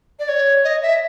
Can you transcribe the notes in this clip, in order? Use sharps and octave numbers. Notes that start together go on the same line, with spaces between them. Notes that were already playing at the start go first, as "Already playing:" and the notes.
D5
C#5
D#5
E5